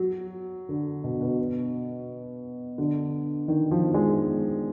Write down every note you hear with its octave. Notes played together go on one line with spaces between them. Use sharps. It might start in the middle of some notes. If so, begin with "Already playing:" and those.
Already playing: F#3
D3
B2
B2
D3
D#3
F3
G#3